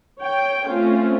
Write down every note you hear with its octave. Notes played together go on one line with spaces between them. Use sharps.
C#5 G5
A3 C4 C#4 F4